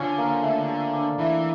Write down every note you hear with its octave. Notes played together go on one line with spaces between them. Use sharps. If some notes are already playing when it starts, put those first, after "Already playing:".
Already playing: D3 F3 C#4
A#3
A3
A4
D4
E3 E4